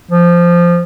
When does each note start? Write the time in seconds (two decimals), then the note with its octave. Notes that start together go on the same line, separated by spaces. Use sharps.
0.11 F3